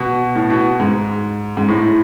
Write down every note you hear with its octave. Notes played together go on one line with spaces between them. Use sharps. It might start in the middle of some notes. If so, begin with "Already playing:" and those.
Already playing: B2
A2
B2
G#2
G#2
A2